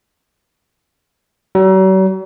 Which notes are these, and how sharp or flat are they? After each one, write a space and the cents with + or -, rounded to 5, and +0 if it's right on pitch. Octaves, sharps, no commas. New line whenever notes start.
F#3 +45